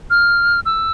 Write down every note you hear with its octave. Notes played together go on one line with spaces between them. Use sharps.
F6
E6